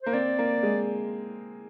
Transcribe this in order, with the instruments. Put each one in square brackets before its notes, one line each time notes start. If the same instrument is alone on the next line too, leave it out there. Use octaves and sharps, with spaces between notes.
[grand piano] A#3 [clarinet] C5
[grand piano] C4 [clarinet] D5
[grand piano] A#3
G#3